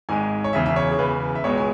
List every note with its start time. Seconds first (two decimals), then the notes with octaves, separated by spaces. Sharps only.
0.09 G#1 G#2 G#3 G#5
0.44 C#5
0.53 E1 E2 C#3 E5
0.66 E5
0.76 C#5
0.91 G#4
0.99 E1 E2 C#3 B4
1.35 E5
1.44 C#2 B2 G#3 C#5
1.58 G#5